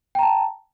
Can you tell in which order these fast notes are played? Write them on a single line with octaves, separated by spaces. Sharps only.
G5 A#5 A5